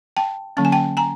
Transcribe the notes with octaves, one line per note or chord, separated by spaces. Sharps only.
G5 A5
D3 F#3 A#3 C#4 A5
G#5
G5 A5
G#5 A#5